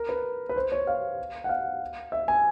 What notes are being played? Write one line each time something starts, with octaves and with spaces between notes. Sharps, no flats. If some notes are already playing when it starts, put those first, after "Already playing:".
Already playing: A#4
B4
B4
C5
C#5
F5
F#5
F5
E5
G#5